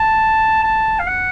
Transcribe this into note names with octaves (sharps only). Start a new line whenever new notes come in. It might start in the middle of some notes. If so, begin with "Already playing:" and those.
Already playing: A5
A5
F5
F#5